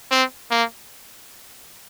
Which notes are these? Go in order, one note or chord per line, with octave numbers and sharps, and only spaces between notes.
C4
A#3